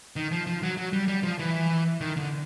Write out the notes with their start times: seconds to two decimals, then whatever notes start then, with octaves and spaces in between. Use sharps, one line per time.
0.16 D#3
0.32 F3
0.47 F3
0.63 F#3
0.77 F#3
0.93 G3
1.08 G3
1.23 F3
1.39 E3
2.01 D#3
2.17 D3